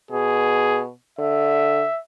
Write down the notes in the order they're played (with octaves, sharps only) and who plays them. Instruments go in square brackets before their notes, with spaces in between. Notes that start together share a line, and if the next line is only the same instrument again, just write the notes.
[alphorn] B2 [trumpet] G#4
[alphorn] D3 [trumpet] E5